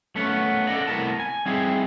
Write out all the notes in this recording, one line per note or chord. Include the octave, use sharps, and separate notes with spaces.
A3 B3 C#4 F#5
A4 D5 D#5 F#5
C2 A2 B3 A#4 A5
G#5
G3 C4 D#4 E4 G#4